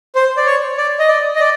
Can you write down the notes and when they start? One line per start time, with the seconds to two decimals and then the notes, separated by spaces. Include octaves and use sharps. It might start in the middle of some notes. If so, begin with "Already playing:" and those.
0.15 C5
0.37 D5
0.46 C#5
0.77 D5
1.00 D#5
1.08 D5
1.35 D#5
1.40 D5